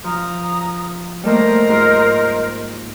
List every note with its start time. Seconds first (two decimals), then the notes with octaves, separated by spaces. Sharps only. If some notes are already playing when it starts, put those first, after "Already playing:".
0.04 F3 A#5 D#6
1.23 G3 A3 A#3 A#4 C5 D#5
1.68 G#2 F4 C6